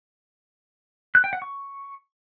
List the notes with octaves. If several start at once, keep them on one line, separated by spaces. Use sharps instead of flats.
F#6
G5
F#5
C#6